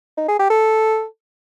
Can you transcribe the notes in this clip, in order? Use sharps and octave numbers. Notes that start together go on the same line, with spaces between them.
D#4
G#4
G4
A4